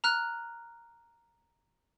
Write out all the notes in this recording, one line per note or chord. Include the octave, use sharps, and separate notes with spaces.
A#5 F6 F#6